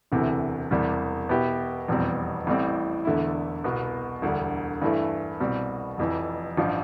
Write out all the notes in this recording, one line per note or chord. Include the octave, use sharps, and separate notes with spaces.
E1 D2 C3 E3 A3
E1 E2 C3 G3
B2 B3 E4 G4
F1 E2 B2 G3 C4
A1 A2 G3 C4
E1 E2 D3 A3 E4
C2 B2 B3
E1 D2 D3 G3
G2 E3 A3 E4
C2 B2 G3 C4
F1 F2 E3
A1 G2 F3